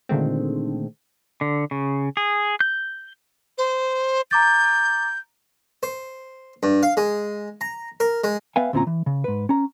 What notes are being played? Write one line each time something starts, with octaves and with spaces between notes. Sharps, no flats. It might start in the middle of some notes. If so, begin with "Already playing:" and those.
A#2 D3 D#3 G#3 A3 C4
D3
C#3
G#4
G6
C5
A#5 D6 G6 A6
C5
G2
F5
G#3
A#5
A#4
G#3
B3 B4 E5 F5 G5 G#5
D2 A#2 C4 C#4 F4 A#5
E3
C#3
G#2 B4
C#4 A#5